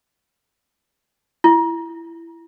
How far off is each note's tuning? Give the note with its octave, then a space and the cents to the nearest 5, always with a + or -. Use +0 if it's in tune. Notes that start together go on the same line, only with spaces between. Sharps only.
E4 +15